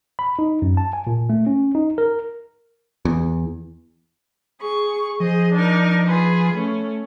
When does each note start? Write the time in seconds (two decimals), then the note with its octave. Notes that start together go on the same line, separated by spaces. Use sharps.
0.19 B5
0.39 D#4
0.62 F#2
0.77 A5
0.93 G#5
1.07 A#2
1.30 A3
1.47 C#4
1.75 D#4
1.98 A#4
3.05 E2
4.61 G#4 C#6
5.20 F3 G#4 C5 D#5
5.53 D4 D#4 A#4
6.07 F4 G#4 B4
6.54 A3 C#4